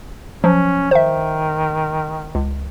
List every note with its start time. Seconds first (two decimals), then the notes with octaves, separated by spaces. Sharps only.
0.44 F3 F#3 C#4
0.91 D#3 C5 E5
2.35 C#2